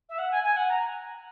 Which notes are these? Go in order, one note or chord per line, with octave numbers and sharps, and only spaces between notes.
E5
F#5
G#5
G#5
F#5
A#5